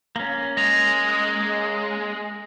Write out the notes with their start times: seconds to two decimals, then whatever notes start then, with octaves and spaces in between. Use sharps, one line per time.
0.16 A#3 C#4
0.57 G#3 A#6 F7